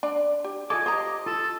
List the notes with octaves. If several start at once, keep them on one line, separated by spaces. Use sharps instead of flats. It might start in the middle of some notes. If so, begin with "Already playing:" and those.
D4 D5
G4
F4 A4 D#5 G#5 D6
G4 C5 D#5 A#5
F4 A4 A5